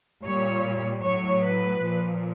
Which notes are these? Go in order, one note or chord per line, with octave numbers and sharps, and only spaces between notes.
A#2 G3 C#5
A2 F#3 C#5
B4
A#2 F3